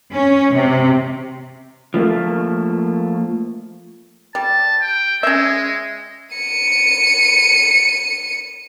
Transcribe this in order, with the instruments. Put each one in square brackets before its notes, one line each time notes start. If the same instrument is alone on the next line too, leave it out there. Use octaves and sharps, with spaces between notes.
[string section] C#4
C3
[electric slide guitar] F3 A3 A#3
[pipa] G3 [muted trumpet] A5
[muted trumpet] G5
[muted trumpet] G#3 [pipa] C#4 E5
[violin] C#7 D#7